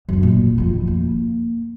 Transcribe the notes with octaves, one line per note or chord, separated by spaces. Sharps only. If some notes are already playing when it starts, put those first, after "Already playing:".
F#2 D3
A#2
F2 D#3
A#3